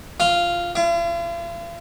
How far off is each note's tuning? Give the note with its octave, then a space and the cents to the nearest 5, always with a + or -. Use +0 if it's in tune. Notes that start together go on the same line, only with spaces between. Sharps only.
F4 -5
F4 -45